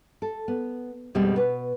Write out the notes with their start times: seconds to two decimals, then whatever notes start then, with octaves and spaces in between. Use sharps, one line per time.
0.22 A4
0.48 B3
1.15 F2 B2 G3 G#3 C4
1.36 B2 B4